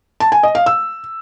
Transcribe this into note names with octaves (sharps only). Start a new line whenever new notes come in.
A5
G#5
D#5
F5
E6